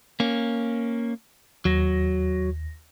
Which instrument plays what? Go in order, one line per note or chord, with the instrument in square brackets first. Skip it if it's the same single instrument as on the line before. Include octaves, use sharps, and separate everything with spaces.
[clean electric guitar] A#3 C#4
[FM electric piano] D#2 A#6 [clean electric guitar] F#3